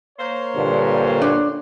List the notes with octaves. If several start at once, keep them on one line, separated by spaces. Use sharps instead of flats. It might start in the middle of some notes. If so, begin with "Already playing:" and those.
A#3 C5 C#5
G2 A#2 D3
D4